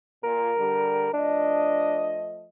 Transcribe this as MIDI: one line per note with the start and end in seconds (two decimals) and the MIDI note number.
0.24 0.51 46
0.24 1.12 70
0.58 1.08 50
0.58 1.08 55
1.13 2.46 53
1.13 2.46 57
1.13 2.18 62
1.13 2.46 75